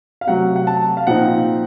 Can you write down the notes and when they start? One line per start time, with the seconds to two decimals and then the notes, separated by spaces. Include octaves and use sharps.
0.21 F5
0.27 C3 F#3 A3 F#5
0.56 F#5
0.67 A5
0.97 F5
1.07 A#2 F3 C4 D#4 F#5